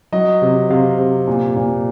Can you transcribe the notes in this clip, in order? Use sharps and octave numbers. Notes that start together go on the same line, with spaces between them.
F#3 D#5
C3
C3 F5
C3
A#2
A#2